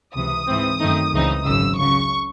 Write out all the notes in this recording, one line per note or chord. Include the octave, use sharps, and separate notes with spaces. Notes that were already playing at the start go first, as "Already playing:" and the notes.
C#2 C3 E3 D#6
G#2 E3 C4
F#2 D#3 A3 C4 D#4
C#2 C#3 E3 C4 D#4
G#1 F#2 C#3 E6
C#2 C#3 F#3 C#6